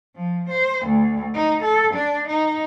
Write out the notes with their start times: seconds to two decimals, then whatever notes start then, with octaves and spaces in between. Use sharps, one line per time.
0.16 F3
0.49 C5
0.86 D2
1.34 D#4
1.63 A4
1.94 D4
2.27 D#4